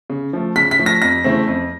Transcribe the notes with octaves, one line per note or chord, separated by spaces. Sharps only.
C#3
F3 A3
C#3 B6
B6
F3 A3
A#6
F2 A#6
C#3 E3 A3 C4
F2